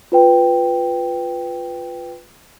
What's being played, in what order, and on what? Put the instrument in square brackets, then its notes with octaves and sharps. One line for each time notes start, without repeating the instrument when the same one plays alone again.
[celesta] F4 B4 G5